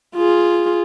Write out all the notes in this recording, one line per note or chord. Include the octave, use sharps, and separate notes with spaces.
F4 G#4